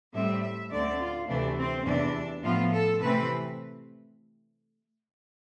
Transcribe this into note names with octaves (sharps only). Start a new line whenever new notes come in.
A2 G3 C4 E5
E5
D2 D3 A3 C4 D5
F4
D2 C3 E3 A3 D4
C4
E2 C3 E3 D4
A2 F3 B3 F4
A4
C3 E3 A3 C4 B4